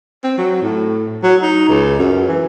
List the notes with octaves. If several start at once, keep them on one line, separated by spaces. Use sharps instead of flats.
C4
F#3
A2
F#3
D#4
C#2
F#2
E3